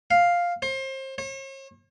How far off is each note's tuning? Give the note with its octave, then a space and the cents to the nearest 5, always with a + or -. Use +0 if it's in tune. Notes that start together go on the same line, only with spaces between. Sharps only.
F5 +5
C5 +30
C#5 -45